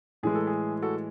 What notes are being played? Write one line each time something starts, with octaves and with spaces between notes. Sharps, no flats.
A2 E3 G#3 G#4
A4
G#4
F#4 A4